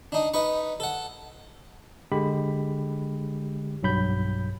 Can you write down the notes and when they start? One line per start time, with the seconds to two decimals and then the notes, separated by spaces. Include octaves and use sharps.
0.12 D4 D#4
0.34 D#4 B4 C#6
0.80 A4 F#5
2.12 D3 G#3 G4 B5
3.83 B1 G2 F#3 B5 G6